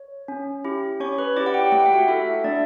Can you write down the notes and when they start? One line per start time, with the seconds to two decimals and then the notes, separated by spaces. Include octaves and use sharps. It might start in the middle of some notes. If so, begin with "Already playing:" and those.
Already playing: C#5
0.28 C#4
0.65 E4 G4
1.00 C#4 C#5 C#6
1.18 B4 B5
1.36 E4 G4 D5 D6
1.46 F#5
1.54 G4 G5
1.72 A3 G5
1.79 F#5
1.86 E5
1.93 F#4 F#5
2.08 E4 A4 E5
2.34 E5
2.44 A3 D4 D5